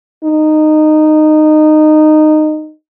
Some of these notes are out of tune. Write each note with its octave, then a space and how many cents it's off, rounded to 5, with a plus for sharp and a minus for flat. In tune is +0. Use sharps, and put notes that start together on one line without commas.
D#4 -15